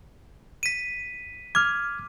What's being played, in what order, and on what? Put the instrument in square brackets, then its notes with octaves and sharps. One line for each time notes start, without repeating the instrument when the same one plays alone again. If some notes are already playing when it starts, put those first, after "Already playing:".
[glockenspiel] B6 D#7
[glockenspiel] D6 [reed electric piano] F6 G#6